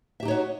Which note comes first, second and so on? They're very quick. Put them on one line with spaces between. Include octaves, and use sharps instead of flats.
E5 G4 D#4 C#5 F#4